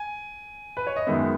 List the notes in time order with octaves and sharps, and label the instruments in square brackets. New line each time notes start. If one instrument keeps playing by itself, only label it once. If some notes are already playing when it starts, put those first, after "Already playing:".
Already playing: [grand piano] G#5
B4
C#5
D#5
F#2 D#3 G#3 B3 E5